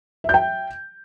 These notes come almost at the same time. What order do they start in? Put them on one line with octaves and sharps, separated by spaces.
E5 G6 G5